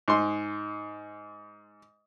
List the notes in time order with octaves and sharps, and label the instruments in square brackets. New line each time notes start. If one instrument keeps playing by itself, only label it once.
[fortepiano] G#2 C6